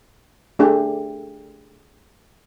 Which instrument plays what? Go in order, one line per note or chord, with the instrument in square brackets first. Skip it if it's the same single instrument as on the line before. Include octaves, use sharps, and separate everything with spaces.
[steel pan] A3 D4 G4 G#4